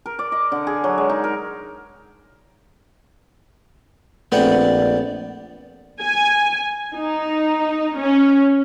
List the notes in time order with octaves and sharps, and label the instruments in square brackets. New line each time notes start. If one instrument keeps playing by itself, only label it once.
[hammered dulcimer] A#4
D5
D#5
D3
G#4
F#3
G#3
D#4
A#4
[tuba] A#1 [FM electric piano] A3 C4 [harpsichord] B3 F#5 G5 [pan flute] D5
[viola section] G#5
D#4
C#4